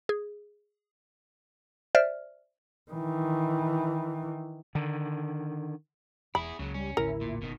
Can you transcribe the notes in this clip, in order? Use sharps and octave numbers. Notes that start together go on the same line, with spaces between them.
G#4
C5 D5 E5 F6
D#3 E3
D3 D#3
E1 E4 G#4 B5
C#2 C#3 F#3
G3 C#4
D#1 A1 D3 E4 A#4
A#2
F#1 B2 D#3